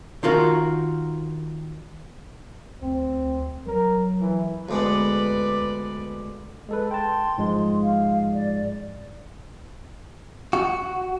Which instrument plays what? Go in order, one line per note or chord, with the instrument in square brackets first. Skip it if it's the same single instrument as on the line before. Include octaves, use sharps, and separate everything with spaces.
[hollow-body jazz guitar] D#3 F4 F#4 A#4
[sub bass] D2 [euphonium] C4
[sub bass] F#3 [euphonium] A#4
[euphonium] E3
[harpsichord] D2 G#3 B3 [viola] B4 D5
[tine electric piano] G#3 A4 B4
[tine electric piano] G5 A5 [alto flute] C6
[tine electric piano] G#2 F3 G#3
[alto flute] F5
D5
[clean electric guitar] F#4